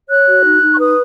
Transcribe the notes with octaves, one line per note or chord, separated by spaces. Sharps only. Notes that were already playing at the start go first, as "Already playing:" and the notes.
C#5 F#6
F#4
D#4
D#4
C#6
B4 D#6